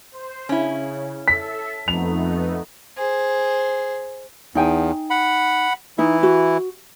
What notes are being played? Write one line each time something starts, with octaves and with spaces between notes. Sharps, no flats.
C5
C#3 C#4 E4
A4 E5 B6
F2 A3 B3 D#4 F7
G#4 C5
E2 D#4 G5 G#5
F#5 B5
E3 D#4 E4 E5
F#4